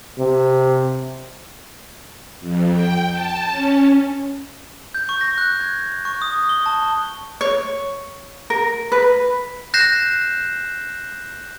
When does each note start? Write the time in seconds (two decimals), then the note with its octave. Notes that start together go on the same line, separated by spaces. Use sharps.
0.19 C3
2.40 F2
2.72 G5
3.11 A5
3.51 C#4
4.95 G6
5.09 C#6
5.21 A#6
5.38 F#6
5.60 G#6
6.05 C#6
6.22 D#6
6.49 G7
6.66 A5
7.41 C#5
8.50 A#4
8.92 B4
9.74 F#6 G6 A#6 C7 E7